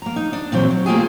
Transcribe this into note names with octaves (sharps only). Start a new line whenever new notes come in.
A#3 A#5
D#4
D4
A#2 E3 F#3 C4
F#3
A3 A#3 C4 F4 G4 G#4